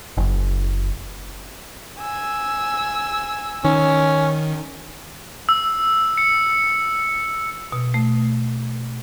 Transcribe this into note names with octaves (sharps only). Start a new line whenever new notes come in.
F#1
G#5 E6
D#3 C#4
E6
C#7
B2
A3